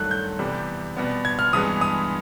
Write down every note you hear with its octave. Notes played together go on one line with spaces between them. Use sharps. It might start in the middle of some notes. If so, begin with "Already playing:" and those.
Already playing: G2 D#3 F#3 A3 F#6
G6
C3 E3 G3 B3
B2 G3 B3
G#6
F6
G2 E3 G#3 B3 D#6
D#6